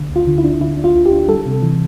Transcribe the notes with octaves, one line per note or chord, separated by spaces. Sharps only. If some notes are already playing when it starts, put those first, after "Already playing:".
Already playing: D3
D2
F4
D3
E4
D4
D3 E4
D4
F4
D2
G4
D4
G3 A4
C3
E3